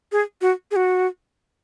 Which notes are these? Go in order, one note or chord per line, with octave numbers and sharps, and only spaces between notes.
G#4
F#4
G#4
F#4